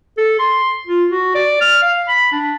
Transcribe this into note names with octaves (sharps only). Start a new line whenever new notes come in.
A4
C6
F4
F#4
D5
F6
F5
B5
D4